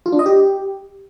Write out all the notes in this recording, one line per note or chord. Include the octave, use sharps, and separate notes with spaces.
F4
D4
D#5
G4